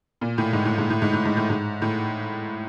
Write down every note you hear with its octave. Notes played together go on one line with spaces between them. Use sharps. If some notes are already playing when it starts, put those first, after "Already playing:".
A#2
A2
G#2
A2
G#2
A2
G#2
A2
G#2
A2
G#2
A2